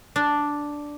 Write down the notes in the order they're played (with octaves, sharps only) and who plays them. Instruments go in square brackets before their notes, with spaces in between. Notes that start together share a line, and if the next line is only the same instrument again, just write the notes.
[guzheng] D4